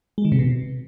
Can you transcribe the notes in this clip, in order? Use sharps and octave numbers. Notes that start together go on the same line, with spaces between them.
G#3
D#3
C3
B2